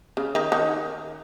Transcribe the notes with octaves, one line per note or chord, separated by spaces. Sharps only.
C#3
D#3
D#3